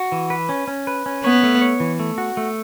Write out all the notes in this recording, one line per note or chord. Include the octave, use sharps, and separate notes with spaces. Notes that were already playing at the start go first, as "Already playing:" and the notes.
Already playing: F#4
E3
B4
C#4
C#4
B4
C#4
B3 C#5
A3
C#5
E3
A3
F#4
A3